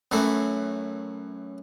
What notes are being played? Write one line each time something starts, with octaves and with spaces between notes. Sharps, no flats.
F#2 E3 F#3 A3 E4